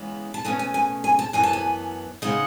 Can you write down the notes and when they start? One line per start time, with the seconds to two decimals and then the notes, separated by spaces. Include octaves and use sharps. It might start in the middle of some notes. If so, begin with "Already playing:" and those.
Already playing: C#3 E3 G#3 B3
0.34 A5
0.45 B2 A3 C#4 G#5
0.59 G#5
0.74 G#5
1.04 G#5
1.19 A5
1.33 F#2 E3 B3 G#5
1.43 A5
1.53 G#5
2.22 C#3 G#3 D#4 F#5